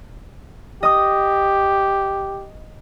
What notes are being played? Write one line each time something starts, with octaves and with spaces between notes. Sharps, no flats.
G4 D#5 D#6